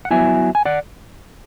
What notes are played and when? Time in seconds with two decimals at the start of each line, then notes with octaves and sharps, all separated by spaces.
0.05 F#5
0.11 F#3 B3 E4 E5 G#5
0.55 G#5
0.65 D5 F#5